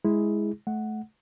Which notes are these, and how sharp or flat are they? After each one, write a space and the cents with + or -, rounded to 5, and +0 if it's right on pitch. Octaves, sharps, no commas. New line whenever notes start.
G#3 +5 E4 -10 G#4 +0
A3 -25 F#5 +0